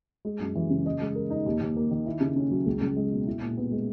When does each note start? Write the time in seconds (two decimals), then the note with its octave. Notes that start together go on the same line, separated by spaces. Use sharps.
0.25 G#3
0.40 F#2
0.55 E3
0.70 C#3
0.86 D#5
1.01 G#3
1.15 A#4
1.30 D#4
1.46 D#2
1.61 D#2
1.76 A#3
1.91 D#3
2.06 E4
2.21 C#3
2.36 C#4
2.51 F#3
2.66 C#2
2.81 C#2
2.97 G#3
3.12 B2
3.27 E4
3.41 A#2
3.57 B3
3.72 G#3